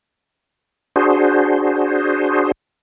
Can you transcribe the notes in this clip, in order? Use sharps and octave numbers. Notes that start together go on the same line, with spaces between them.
D4 F#4 G#4 C5